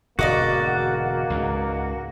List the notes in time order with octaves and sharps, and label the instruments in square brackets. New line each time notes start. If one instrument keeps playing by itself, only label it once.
[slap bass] E1 G#2 D3 [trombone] A#3 [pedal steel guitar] F#4 [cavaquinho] D5 D#5 D6
[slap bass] C#2 G#2